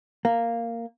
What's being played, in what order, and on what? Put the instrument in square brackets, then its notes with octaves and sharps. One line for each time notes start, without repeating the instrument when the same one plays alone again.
[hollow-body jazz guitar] A#3